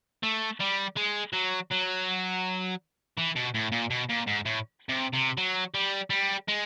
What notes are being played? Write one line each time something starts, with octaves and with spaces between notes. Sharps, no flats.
A3
G3
G#3
F#3
F#3
E3
B2
A2
A#2
B2
A#2
G#2
A2
C3
C3
F#3
G3
G3
G#3